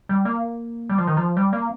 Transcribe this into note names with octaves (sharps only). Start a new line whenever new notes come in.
G3
A#3
G3
F3
D#3
F3
G3
A#3